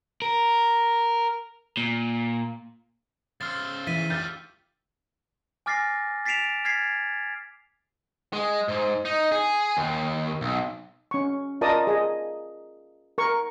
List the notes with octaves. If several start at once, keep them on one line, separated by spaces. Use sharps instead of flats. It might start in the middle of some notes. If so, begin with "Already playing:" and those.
A#4
A#2
C#3 C5 E6 F6 A6
E3 A6 B6 D#7
F4 G4 F6 G6 A6
G#5 D6 F6 A6 A#6 C7
A6 B6 C7 D7 E7 F7
F6 G#6 A6 B6 C7
G#3
G#2
D#4
G#4
D#2
B1
C#4 C#6
F4 A#4 D5 D#5 A5 D#6
G#4 D#5
A#4 C#6